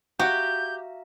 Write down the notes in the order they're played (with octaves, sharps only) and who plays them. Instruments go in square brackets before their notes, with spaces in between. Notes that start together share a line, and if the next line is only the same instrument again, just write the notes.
[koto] F#4 [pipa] G4 [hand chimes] E5 F5 A#5 [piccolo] G6